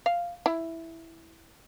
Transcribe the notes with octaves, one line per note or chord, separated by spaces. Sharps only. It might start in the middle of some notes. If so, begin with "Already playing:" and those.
F5
E4